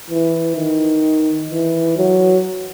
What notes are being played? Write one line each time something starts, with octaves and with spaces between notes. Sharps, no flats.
E3
D#3
E3
F#3